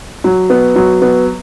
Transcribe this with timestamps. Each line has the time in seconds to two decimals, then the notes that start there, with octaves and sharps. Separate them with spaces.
0.24 F#3
0.50 B3
0.76 F#3
1.02 B3